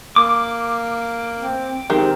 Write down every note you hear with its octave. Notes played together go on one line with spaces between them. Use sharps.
A#3 D6
C4
D#3 G#3 C4 G4